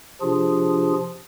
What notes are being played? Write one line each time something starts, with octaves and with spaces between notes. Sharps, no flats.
C3 F3 D4 F4 G#4